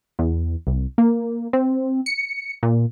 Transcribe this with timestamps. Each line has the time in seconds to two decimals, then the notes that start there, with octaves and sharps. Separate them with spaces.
0.19 E2
0.67 C2
0.98 A#3
1.53 C4
2.06 C#7
2.63 A#2